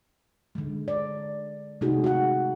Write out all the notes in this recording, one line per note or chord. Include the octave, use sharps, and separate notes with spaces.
D3 G#3
D5
C3 G#3 A3 D#4 F#4 G#4
F#4 F#5